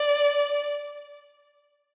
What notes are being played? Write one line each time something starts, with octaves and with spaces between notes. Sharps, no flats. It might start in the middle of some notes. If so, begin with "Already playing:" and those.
Already playing: D5